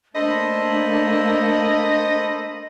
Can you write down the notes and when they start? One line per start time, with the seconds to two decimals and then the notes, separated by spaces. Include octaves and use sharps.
0.15 A3 A#3 D4 A4 C5 D#5 B5